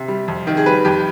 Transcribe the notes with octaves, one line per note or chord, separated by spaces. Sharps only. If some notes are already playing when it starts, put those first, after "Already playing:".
Already playing: C3
G3
F2
D#3
G#4
G3 B4
F2 G4